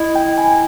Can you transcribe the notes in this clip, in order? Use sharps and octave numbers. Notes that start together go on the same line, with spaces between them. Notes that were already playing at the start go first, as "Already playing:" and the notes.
Already playing: E4 D#5
G5
G#5